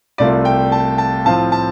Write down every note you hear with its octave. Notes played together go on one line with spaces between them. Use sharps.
C2 C3 A3 F4 D5
G5
A5
A5
A2 F3 C4 F4 A5
A5